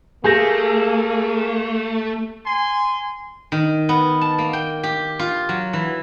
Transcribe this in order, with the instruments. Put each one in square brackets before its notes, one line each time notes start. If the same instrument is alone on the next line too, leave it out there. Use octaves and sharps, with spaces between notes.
[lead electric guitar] A3 [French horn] A#3 [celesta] G4 G6 A#6 [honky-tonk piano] G#4
[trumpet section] G#5 C6
[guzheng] D#3
B3
A5
A#3
G5
G4
F4
F#3
E3